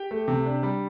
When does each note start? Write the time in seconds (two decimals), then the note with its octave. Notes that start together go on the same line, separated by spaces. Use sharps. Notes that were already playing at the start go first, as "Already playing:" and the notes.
Already playing: G4 G5
0.11 A3
0.28 C3
0.46 D4
0.63 G3